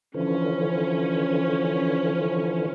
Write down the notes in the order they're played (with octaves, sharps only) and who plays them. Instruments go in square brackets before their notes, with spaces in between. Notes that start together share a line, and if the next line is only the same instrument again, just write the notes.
[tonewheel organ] D3 E3 F3 [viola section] C#4